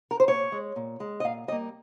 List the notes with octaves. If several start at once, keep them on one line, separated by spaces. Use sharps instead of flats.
A#4
C5
A#2 C#5
G#3
A#2
G#3
D#5
A#2 F5
G3 A#3 D#5